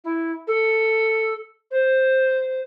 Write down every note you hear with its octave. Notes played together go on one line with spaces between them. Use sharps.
E4
A4
C5